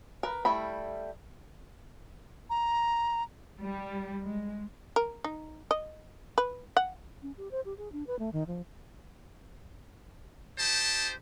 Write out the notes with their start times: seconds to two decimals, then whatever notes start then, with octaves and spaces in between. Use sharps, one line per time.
0.23 A#4 B4
0.45 G3 A3 E4 B5
2.50 A#5
3.60 G3
4.24 G#3
4.96 A#4
5.24 D#4
5.71 D#5
6.38 B4
6.77 F#5
7.22 C#4
7.37 G4
7.51 C5
7.65 G4
7.78 G#4
7.92 D4
8.07 B4
8.19 A3
8.33 D#3
8.47 F3
10.58 D#4 G4 C5 A5